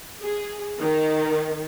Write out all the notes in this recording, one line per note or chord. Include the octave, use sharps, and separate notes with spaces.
G#4
D#3